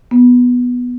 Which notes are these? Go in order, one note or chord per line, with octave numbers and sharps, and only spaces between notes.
B3